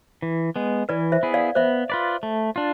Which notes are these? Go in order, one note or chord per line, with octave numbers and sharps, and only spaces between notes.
E3
G#3 B3
E3 B4 D5
C5 E5
B3 E4 G#4
D5 F5
B3 C5 E5
F4 B4 D5
A3
D4 F4